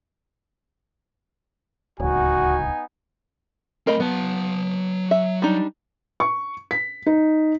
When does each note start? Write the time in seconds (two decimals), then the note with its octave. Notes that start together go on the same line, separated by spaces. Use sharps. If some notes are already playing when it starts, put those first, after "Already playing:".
2.00 D1 C#2 B3 D#4 F#4 G#5
3.87 A3 C4 A#4 D#5 B5
4.00 F#3 B3 A5
5.11 E5
5.42 G3 D4 D#4
6.20 C#6
6.71 B6
7.06 D#4